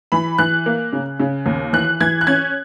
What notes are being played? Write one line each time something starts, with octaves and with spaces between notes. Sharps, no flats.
E3 B5
E3 F#6
A#3
C#3
C#3
D#2
E3 F#6
E3 G#6
F#6
C#4 G#6